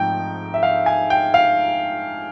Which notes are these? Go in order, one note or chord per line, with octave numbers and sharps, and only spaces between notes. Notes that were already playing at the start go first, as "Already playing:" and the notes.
Already playing: G#2 F3 A3 C4 D#4 G5
E5
F5
G#5
G5
F5